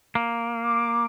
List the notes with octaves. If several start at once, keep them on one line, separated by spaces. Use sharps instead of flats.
A#3
D6